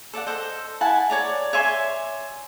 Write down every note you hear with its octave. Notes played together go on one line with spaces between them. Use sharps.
A4 D5 D#5 F#5
A4 C5 D#5
E4 F#5 G#5 A5
C#5 D5 A#5
C#5 E5 G#5 C6